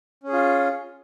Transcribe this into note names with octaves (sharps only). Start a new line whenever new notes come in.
C#4 F4 G#4